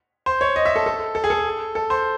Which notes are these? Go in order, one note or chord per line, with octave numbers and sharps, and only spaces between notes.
C5
C#5
D#5
E5
A4
A4
A4
G#4
A4
A4
C5